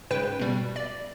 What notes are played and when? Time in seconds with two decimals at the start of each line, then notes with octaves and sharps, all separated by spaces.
0.11 G#2 C#3 B4 G5
0.39 B2 G3
0.76 D5